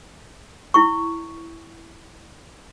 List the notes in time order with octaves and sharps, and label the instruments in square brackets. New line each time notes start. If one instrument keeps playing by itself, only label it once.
[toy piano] E4 C#6